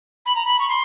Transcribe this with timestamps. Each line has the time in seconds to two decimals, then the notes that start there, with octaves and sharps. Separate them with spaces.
0.25 B5
0.35 A#5
0.45 B5
0.58 C#6
0.68 C6